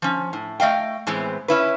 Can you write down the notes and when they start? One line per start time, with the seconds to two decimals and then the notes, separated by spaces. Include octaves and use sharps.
0.02 F3 C#4
0.33 A2
0.60 A3 D#5 F5 G5
1.07 A2 E3 G#3 B3 C4
1.48 C#4 E4 B4